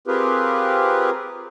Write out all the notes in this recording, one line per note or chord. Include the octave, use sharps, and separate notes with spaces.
C4 F4 G4 G#4 A#4 B4